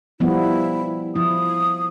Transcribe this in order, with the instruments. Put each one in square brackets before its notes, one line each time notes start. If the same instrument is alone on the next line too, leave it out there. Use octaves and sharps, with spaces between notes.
[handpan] F3 G3 B3 [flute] E4
[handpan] F3 E4 [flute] D#6